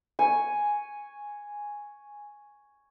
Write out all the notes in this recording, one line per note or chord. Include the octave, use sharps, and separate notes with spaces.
G#5 C#6